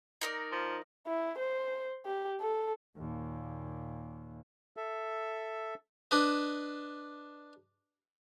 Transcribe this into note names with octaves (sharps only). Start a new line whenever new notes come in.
D#4 A#4 D5
F3
E4
C5
G4
A4
D#2 A#2
A4 E5
D4 B4 D#5